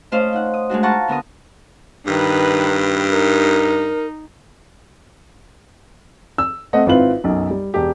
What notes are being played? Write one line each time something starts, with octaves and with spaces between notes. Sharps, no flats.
A3 C#4 F4 C5 D#5 F5
D#4 F#5
D#6
G#3 A3 D4 F#4
F4 F#5 A5 A#5 C#6
D3 B3 A#4 D#6
G2 D#3 B4
D#4 A#4
E6
A3 C4 D#5 F#5
G#1 C4 E4 F4 B4 F#7
B1 F#2
G3
E1 G4